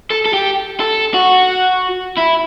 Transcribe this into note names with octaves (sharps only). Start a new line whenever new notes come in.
A4
A4
G4
A4
F#4
E4